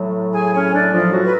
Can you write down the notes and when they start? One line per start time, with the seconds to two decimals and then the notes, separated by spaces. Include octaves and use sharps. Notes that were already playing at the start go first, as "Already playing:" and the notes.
Already playing: A2 F#3
0.34 G#4 G#5
0.53 C#4 C#5
0.73 D4 D5
0.92 F3 F4
1.12 F#3 F#4
1.25 B4